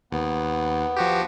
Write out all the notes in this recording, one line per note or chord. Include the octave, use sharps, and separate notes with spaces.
D#2 B3
F3 F#4 G4